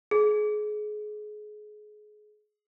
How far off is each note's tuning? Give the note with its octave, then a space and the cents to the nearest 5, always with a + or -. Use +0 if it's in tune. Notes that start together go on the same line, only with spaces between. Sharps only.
G#4 +30